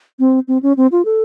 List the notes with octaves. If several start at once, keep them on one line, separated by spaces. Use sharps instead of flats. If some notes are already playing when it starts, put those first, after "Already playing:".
C4
C4
C#4
C4
F4
A4